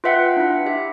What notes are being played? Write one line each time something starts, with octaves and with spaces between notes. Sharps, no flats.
F4 B4 E5 F#5 G5
D4 E4
G4 E5